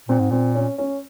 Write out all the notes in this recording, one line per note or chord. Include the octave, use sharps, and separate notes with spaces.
A#2 C4
G#2
A#2 C4
C#4
C#4